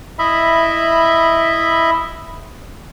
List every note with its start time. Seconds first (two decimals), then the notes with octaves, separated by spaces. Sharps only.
0.19 E4 D#5 E5 B5